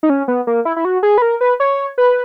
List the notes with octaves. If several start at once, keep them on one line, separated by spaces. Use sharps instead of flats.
D#4
C#4
B3
A#3
E4
E4
F#4
G#4
B4
A#4
B4
C#5
B4